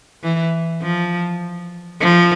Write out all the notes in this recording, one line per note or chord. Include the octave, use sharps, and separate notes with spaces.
E3
F3
F3